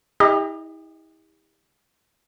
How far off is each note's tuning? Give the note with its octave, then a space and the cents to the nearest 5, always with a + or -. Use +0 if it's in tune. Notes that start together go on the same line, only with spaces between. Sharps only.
E4 -40 G4 +40 D#5 -5